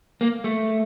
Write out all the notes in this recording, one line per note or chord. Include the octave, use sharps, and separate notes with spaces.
A#3
A3